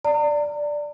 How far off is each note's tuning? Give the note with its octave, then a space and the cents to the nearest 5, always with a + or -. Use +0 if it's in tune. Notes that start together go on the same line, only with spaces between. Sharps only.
D5 +0 A#5 -40